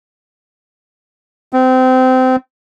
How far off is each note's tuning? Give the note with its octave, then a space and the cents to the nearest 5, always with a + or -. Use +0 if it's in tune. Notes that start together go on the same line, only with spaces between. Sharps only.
C4 -25